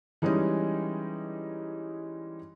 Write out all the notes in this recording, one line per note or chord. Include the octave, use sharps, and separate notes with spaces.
E3 G3 G#3 C#4 D#4